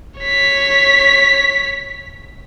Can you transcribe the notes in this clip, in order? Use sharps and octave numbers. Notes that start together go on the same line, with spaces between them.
C#5 B6